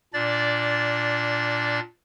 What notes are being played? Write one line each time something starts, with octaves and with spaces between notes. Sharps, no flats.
A#2 D4 D5 A6